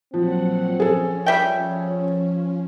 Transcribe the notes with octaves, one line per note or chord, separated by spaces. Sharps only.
A#2 F3 F#3 C4 F#5
F3 C#4 G#4 A4
G3 C#5 E5 G5